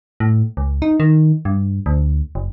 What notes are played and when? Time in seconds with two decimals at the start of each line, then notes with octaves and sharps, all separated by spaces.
0.20 A2
0.57 C#2
0.82 D#4
1.00 D#3
1.45 G2
1.86 D2
2.35 F#1